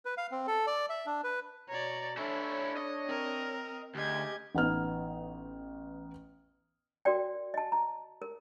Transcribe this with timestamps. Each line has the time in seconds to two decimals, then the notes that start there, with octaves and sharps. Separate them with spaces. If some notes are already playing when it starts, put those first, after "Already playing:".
0.05 B4
0.18 F5
0.32 C4
0.47 A4
0.67 D5
0.89 E5
1.06 D4
1.24 B4
1.69 B2 C#5 D5 A#5
2.17 C#4 D4 E4 A4 C#5
2.76 D#5
3.06 C4 A#4
3.95 D2 G#3 C#4 G4 D#5 G#6
4.55 A1 B3 D#4 F6
7.05 F#4 A#4 D5 G5
7.54 D#5 A5
7.72 A#5
8.22 A#4